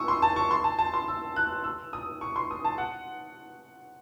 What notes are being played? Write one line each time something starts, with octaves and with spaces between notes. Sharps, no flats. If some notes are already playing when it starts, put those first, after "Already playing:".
Already playing: C#6 D#6 E6
C6
A5
C#6
C6
A5
A5
C6
E6
F#6
E6
D#6
C#6
C6
D#6
A5
F#5